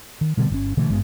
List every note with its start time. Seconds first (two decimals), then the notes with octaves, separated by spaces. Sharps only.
0.21 D#3
0.37 B2 D3 G3 B3
0.50 G1 C#3 C#4
0.77 B2 D3 E3 A3
0.90 G#1 G2 G#3 B3